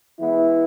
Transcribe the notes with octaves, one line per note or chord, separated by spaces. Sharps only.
E3 G#3 B3 E4